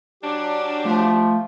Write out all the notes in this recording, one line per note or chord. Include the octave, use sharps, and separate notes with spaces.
F#3 C#4 D4 G4
F3 A3